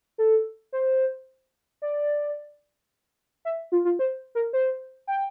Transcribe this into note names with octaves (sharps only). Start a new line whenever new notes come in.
A4
C5
D5
E5
F4
F4
C5
A#4
C5
G5